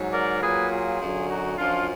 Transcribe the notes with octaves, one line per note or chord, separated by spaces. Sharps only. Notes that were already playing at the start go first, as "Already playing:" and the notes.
Already playing: G#2 F#3
A#4 D5
A#2 F#3 G#4 B4
F4 G#4
F#2 D3 F#3
D#4 F#4
F#2 F3 D4 F4